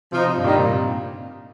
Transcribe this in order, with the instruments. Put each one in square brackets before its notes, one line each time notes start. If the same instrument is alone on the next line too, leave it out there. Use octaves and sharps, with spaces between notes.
[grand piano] C3 [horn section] F3 D#4
[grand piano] G2
[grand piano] A#2 [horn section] D#3 G3 A#3 D#4
[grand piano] C3
A#2